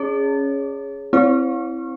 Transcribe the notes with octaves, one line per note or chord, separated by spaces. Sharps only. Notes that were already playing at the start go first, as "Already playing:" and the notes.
Already playing: C#4 G#4 C#5
C4 E4 C5